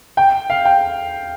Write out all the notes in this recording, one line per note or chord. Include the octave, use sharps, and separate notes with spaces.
G5
F5
G5